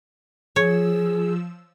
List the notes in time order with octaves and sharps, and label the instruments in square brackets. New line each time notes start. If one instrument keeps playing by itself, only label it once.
[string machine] F3 E6 [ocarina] G#4 [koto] C#5